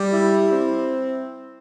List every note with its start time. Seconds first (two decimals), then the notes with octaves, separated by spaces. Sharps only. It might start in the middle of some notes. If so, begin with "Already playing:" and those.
Already playing: G3
0.11 E4
0.52 C4